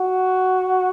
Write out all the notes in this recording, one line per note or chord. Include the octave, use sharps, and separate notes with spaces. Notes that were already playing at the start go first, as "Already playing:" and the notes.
Already playing: F#4